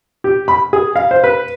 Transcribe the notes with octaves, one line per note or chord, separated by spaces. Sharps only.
G4
B5
G#4
F5
C5
B4